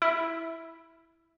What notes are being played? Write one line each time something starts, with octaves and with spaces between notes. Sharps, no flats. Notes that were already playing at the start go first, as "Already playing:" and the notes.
E4